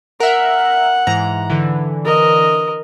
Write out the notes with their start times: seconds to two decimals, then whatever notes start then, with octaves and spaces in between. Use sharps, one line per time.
0.20 A#4 E5 F#5
1.07 G#2 E3 A#5
1.50 D3 E3
2.05 A#4 D#5